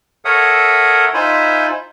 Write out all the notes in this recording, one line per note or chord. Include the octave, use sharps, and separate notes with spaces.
A4 A#4 C#5 E5 F#5 D#6
D#4 F4 C5 E5 G#5 B5